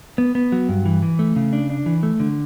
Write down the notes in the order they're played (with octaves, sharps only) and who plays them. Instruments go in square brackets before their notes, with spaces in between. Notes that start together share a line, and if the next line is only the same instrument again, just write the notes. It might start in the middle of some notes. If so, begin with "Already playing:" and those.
[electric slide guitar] B3
B3
F#3
G2
E3
E3
A3
C#3
D4
D4
E3
A3
D3